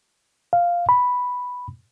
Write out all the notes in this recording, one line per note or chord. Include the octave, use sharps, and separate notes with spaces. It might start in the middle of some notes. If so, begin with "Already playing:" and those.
F5
B5